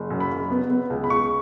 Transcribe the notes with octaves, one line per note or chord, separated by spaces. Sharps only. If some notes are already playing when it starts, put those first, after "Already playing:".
Already playing: F#1
F#2
B5
F#1
B3
B3
C#2
B5
C#2 C#6